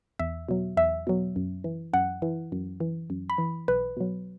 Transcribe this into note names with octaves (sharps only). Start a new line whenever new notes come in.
E2 E5
B2 F#3
E2 E5
B2 F#3
F#2
E3
F#2 F#5
E3
F#2
E3
F#2
B5
E3
B1 B4
B2 F#3